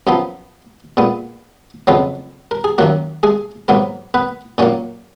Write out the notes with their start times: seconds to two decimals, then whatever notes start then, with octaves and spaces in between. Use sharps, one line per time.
0.07 F#2 F3 B3 D#4
0.97 A#2 G#3 B3
1.87 F2 C#3 F3 F#3 B3 F4
2.51 A#4
2.64 G#4
2.78 F#2 D#3 F#3 A#3 F#4
3.23 G#3 G#4
3.68 G#2 F#3 A#3 B3 A#4
4.14 B3 B4
4.58 A#2 F#3 A#3 C#4 C#5